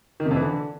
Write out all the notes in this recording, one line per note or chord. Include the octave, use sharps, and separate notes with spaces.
D#3
C3
F2
E3
D3